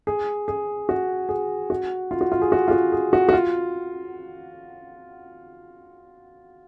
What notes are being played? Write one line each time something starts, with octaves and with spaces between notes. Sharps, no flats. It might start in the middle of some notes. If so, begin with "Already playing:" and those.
G#4
G#4
F#4
G#4
F#4
F4
F#4
F4
G#4
F#4
F4
F#4
G#4
F#4
F#4
F4